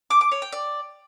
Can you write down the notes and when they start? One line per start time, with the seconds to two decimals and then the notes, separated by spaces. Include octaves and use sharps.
0.10 D6
0.21 D6
0.31 C#5
0.42 G5
0.52 D5